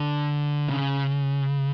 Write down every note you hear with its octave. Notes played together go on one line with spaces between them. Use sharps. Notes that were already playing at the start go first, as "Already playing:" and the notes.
Already playing: D3
C#3